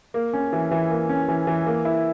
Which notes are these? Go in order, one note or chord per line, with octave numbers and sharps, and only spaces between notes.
A#3
C#4
E3
E3
A#3
C#4
E3
E3
A#3
E4